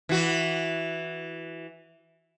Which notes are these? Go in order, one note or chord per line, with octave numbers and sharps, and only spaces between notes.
E3 F#4